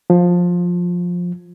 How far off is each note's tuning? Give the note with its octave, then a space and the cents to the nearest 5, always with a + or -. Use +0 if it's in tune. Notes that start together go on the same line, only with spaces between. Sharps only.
F3 +15